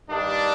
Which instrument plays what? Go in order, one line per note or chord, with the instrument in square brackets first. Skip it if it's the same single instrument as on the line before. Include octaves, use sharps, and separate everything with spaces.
[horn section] G2 D#3 G3 D4